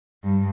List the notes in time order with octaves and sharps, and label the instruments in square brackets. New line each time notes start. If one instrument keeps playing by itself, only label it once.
[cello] G2